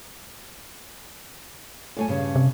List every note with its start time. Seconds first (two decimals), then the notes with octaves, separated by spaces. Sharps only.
1.97 F#2 A3 G#5
2.08 G2 C#3
2.36 C3